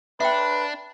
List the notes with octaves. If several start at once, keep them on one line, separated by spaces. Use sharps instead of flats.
D4 B4 E5 G5